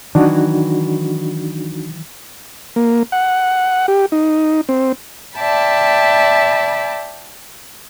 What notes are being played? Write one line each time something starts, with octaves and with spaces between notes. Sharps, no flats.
D#3 E3 F#3 D4 D#4 F#4
A#3
F#5
G4
D#4
C4
D5 E5 G5 A5 B5